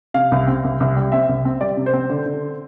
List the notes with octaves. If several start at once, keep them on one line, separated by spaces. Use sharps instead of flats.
C3 F5
C2
C4
C2
C2
G3
C4 E5
C2
C4
G3 D5
C3
C5
C4
D3
D3